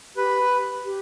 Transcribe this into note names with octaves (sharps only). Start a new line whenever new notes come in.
G4 B4
G4